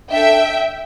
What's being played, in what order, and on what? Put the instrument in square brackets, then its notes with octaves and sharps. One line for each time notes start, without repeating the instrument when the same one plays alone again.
[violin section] D4 A4 E5 G5